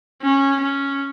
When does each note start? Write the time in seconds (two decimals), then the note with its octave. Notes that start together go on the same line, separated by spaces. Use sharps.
0.22 C#4
0.60 C#4